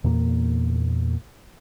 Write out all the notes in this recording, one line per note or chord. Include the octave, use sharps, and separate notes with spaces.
E2 A#2 A#3